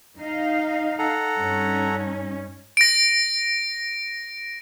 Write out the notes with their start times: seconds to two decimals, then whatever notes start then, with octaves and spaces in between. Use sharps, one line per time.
0.18 D#4 F5
0.99 A4 F#5 A#5
1.40 G2 C#4 D#4
2.77 A#6 D7